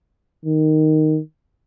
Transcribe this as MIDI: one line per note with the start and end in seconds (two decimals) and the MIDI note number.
0.45 1.19 51